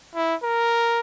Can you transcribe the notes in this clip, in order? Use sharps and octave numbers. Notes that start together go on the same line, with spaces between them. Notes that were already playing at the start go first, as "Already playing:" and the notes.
E4
A#4